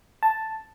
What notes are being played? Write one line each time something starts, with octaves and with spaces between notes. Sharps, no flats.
A5